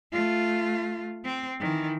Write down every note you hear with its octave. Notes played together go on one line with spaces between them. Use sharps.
A3 F4
C4
D#3 E3